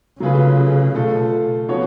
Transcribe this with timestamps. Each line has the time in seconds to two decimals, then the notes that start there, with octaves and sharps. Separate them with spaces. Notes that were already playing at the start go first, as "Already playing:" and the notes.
0.20 C#3 F#3 A3 F4 G#4 B4
0.95 B2 A3 F4 A4
1.69 F3 B3 F#4 C#5